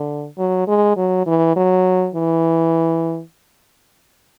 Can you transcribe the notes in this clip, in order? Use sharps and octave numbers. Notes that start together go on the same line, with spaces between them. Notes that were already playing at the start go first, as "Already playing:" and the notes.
Already playing: D3
F#3
G#3
F#3
E3
F#3
E3